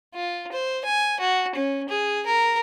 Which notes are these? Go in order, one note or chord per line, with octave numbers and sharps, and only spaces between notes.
F4
C5
G#5
F#4
C#4
G#4
A#4